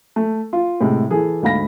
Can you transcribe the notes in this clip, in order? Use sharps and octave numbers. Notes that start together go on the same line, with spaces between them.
A3
F4
A2 C3 G#3
E3 G#4 A4
D2 G#2 F5 B5 A#6